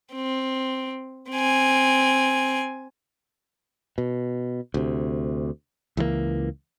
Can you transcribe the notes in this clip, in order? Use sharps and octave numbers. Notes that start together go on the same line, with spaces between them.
C4
C4 G#5
B2
D2 C3
C#2 E3 F3 A#3